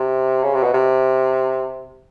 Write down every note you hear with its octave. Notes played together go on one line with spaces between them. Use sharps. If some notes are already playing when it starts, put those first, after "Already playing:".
Already playing: C3
C#3
C3
B2
C3